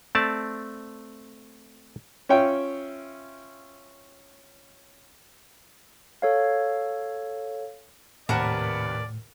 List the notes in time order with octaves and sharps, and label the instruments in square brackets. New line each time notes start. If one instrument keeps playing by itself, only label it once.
[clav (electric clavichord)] A3 C4 D5 A5
[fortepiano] C#4 F4 C#5 E5 G5
[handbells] A4 C#5 F5
[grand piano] D#2 C3 F#5 [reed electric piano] A2 [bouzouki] A#4 B4 A5 [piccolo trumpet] D5